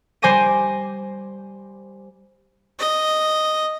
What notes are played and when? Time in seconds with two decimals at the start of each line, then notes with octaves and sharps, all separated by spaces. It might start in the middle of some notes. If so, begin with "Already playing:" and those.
0.22 G3 C5 G#5 D6 A#6 D#7
2.79 D#5